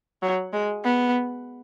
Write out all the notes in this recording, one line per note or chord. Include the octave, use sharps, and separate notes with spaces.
F#3
G#3
B3